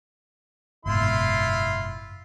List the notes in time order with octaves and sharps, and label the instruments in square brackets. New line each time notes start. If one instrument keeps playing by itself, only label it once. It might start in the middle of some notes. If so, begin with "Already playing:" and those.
[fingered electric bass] F#1 G#2 B2 [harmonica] E4 F4 C6